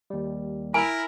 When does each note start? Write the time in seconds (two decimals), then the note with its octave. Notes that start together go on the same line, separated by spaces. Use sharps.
0.10 D#2 G3
0.74 E4 A#4 G#5